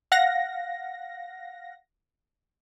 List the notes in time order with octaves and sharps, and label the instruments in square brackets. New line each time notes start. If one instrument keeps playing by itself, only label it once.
[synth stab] F5 F#5 A#6